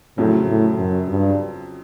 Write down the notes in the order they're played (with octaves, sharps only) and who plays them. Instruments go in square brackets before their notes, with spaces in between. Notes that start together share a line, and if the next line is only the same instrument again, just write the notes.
[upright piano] F2 C#3 F#3 [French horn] A2
[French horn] A2
F#2
G2